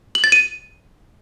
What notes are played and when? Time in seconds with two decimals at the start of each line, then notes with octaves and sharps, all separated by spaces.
0.15 F#7
0.24 A6
0.32 D#7